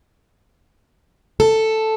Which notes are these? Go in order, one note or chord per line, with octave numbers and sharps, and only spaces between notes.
A4